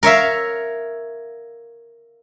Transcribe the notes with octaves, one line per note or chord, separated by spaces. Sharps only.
A#4 C#5 E5 F5